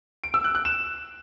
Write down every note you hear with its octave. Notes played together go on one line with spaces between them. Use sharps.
D7
E6
F#6
F#6
E7